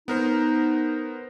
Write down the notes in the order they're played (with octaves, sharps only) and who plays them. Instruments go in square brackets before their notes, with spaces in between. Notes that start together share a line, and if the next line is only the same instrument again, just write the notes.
[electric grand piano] B3 A#4 C5 [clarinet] D#4